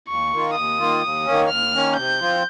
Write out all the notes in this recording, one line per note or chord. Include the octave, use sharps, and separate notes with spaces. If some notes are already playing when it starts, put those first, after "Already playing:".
D#2 C#6
D#3 A#3 F4
D#2 D#6
D#3 A#3 F4
D#2
D#3 A#3 C#4
D#2 F6
D#3 A#3 C#4
C3 G6
F3 C4 F4